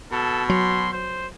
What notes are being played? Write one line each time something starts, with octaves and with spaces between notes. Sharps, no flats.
B2 A4
F#3 C6
C5